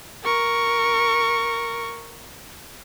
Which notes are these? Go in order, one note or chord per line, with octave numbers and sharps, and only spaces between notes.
A#4 C#6